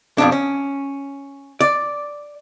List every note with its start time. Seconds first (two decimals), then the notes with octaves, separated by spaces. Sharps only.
0.18 F2 B2 D4
0.32 C#4
1.61 D5